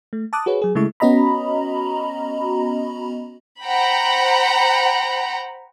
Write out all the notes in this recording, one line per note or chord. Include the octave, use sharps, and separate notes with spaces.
A3
A5 D6 D#6 F#6
F#4 G#4 B4 C#5
F#3 G#4
C#3 G#3 A3 E4 C#6
B3 C#4 F#4 D#5 A#5 B5
C5 F#5 G5 A#5 B5